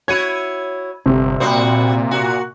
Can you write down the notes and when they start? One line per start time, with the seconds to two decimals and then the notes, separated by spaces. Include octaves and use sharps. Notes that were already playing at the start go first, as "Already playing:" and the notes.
0.08 E4 F#4 C#5 G#6 D#7
1.06 G1 C3
1.40 A#2 G3 F#4 C5
2.11 A#3 F#4